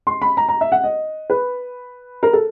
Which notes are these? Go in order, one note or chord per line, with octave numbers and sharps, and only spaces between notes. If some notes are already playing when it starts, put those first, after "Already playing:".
C6
B5
A#5
A#5
E5
F#5
D#5
B4
A#4
A4